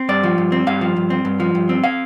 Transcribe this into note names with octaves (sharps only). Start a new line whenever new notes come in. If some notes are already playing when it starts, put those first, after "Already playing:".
Already playing: C4
G2 D5
F3
G2
C4
G2 F5
F3
G2
C4
G2
F3
G2
C4
F5